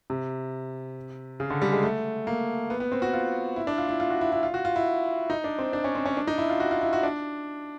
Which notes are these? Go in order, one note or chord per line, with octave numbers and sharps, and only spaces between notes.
C3
C#3
D3
G3
G#3
A3
A#3
B3
B3
C4
F#4
F4
E4
D4
F4
E4
F4
F#4
E4
E4
F4
F#4
F4
E4
D#4
D4
C4
D4
C#4
C4
C#4
D4
D#4
E4
F4
F#4
F4
E4
F#4
D4